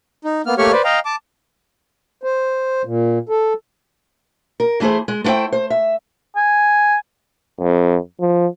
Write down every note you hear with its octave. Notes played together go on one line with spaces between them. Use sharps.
D#4
A#3 B3 F6
A3 A#3 G4 C#5 C#6 F6
B4 C5 D5
D#5 F5 G5 A#5
A5 D6
C5
A#2
A4
A#4
E3 A3 E4 G#4 C5
G#3
A3 B3 E4 C5 G5
C5
E5
G#5
F2
F3